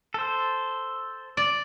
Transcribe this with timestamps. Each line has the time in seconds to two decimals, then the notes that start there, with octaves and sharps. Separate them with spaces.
0.14 A4 C5
1.37 D5